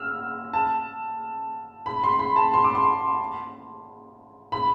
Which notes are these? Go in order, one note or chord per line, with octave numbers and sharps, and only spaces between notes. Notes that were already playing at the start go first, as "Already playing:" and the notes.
Already playing: E6 F6
A5
B5
C6
B5
A5
C6
D6
C6
B5